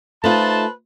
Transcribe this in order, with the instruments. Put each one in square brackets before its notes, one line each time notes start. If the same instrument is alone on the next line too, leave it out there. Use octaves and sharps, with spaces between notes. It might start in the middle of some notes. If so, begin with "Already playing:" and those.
[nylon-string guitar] A3 D#4 F4 [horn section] B4 C5 A5